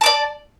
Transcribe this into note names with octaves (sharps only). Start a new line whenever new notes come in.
D5 A5 D6